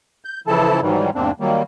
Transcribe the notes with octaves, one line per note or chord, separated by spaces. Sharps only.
G6
C#3 E3 F3 E4 A4 A5
G#2 D#3 E3 F#3 G3
E2 G#2 C3 A#3 C4 D4
D#3 F#3 G3 A#3